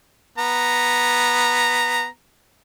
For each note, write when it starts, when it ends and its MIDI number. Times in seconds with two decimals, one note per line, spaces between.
0.38 2.06 59
0.38 2.06 82